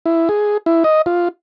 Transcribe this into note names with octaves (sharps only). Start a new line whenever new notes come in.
E4
G#4
E4
D#5
F4